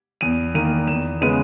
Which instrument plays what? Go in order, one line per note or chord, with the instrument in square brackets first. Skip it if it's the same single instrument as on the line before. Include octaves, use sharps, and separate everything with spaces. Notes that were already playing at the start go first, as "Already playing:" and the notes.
[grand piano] E2 D#7
D#3 A#3 D#7
E2 E7
C#3 G#3 B3 D#7